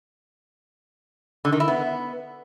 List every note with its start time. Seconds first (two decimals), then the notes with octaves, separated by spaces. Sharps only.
1.45 D3
1.52 D#3
1.60 E4
1.68 B3